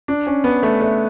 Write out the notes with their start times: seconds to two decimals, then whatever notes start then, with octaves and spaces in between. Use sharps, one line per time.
0.08 D4
0.27 C#4
0.44 B3
0.63 A3
0.81 A3